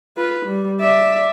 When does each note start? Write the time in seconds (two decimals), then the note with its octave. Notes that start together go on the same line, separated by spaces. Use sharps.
0.17 F4 B4
0.46 G3
0.81 D5 E5